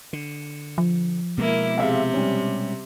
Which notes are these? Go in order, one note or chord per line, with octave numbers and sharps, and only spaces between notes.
D3
F3
B2 G#3 A#3 B3 E4
C3 G#4 E5 F5
G3 C#4